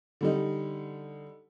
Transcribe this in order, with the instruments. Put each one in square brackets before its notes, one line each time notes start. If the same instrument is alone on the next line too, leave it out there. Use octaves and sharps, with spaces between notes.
[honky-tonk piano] D3 G3 D#4